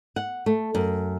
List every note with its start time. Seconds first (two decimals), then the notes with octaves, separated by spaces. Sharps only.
0.16 F#5
0.46 A3
0.75 F#2